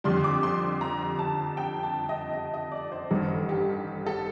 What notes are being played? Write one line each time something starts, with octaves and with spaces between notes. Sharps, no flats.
F2 D3 G3 C6
D6
C6
A#5
A5
G5
A5
D#5
D#5
D#5
D5
C5
A1 G2 D#3 A4
G4
A4